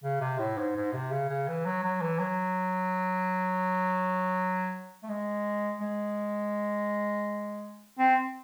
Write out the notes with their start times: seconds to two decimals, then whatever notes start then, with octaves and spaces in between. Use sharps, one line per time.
0.03 C#3
0.20 C3
0.38 A2
0.58 G#2
0.76 G#2
0.93 C3
1.12 C#3
1.29 C#3
1.48 E3
1.65 F#3
1.83 F#3
2.01 E3
2.19 F#3
5.03 A3
5.09 G#3
5.81 G#3
7.99 C4